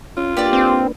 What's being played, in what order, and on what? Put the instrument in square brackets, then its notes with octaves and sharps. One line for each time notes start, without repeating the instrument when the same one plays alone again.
[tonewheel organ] C#4 [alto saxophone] F4
[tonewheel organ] A#3 D4 B4 [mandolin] G4 D5
[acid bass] C4